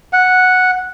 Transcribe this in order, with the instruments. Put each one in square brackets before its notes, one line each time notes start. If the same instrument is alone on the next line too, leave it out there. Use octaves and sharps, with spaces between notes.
[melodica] F#5